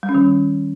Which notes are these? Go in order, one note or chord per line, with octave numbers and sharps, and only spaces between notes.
G3
C#4
D#3